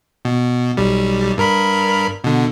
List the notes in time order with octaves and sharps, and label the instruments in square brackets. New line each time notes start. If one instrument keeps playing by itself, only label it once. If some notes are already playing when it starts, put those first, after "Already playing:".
[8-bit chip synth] B2
B1 G3
G2 A#4 B5
B2 D3